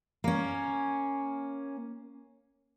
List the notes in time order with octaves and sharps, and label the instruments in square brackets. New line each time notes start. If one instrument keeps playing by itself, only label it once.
[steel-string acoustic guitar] A#3 C#4